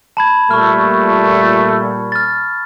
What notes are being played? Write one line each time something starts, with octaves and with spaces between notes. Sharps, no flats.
A5 B5 G#6
A#2 G3 A3 C#6 F6
F6 A6